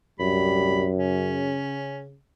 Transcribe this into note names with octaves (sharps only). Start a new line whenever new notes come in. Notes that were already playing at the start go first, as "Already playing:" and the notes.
C2 F#2 A2 G3 B5
C#3 C#4